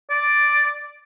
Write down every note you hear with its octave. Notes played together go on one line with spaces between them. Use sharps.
D5